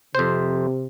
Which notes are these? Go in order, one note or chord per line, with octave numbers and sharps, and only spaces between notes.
F2 C3 C5